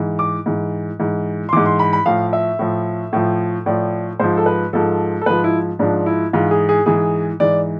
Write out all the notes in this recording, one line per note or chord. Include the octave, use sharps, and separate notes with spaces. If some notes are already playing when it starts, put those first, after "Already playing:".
Already playing: G#2 E3
D6
G#2 E3
G#2 E3
C6
G#2 E3 D6
C6
B5
B5
A2 F3 F5
E5
A2 F3
A2 F3
A2 F3 D5
G#2 F3 C5
A4
B4
G#2 F3 A4
A4
G#2 F3 B4
E4
G#2 F3 D4
E4
G#2 E3 F4
G#4
G#4
G#2 E3 G#4
G#2 E3 D5